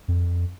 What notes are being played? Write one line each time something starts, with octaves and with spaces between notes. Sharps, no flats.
F2